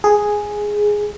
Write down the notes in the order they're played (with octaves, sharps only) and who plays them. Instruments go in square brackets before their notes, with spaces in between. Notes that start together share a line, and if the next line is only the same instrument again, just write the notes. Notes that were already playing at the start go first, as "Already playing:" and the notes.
[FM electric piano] G#4